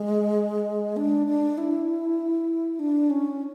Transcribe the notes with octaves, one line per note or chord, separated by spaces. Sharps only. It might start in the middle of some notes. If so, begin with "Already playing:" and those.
Already playing: G#3
D4
D4
E4
D4
C#4